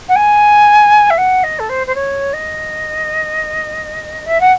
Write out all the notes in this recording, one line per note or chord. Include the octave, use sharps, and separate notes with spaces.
F#5
G#5
E5
F#5
D#5
A4
C5
C5
C#5
D#5
E5
F#5